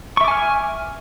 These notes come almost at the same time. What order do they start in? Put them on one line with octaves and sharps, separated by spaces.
C#6 E5 D6 G#5 F6